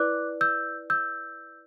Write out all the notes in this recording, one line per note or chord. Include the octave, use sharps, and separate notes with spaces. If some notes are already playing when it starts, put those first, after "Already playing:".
Already playing: E4 B4 D5 D6 F#6
E6 G6
E6 G6